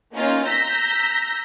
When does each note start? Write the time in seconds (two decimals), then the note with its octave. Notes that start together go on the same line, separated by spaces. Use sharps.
0.13 A#3 C#4 D#4 F4
0.45 A#5 E6 G6 A#6 B6